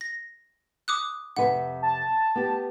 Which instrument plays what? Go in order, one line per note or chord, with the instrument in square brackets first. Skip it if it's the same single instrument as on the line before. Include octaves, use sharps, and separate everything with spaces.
[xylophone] A#6
D6 D#6 F#6
[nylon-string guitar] F2 C3 B4 [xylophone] F#5
[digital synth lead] A5
[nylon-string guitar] B3 G4